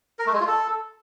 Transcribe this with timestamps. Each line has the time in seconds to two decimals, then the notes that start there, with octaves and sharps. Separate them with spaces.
0.19 A#4
0.26 A3
0.33 G#3
0.40 F4
0.47 A4